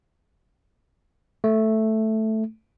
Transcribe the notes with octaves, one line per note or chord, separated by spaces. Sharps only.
A3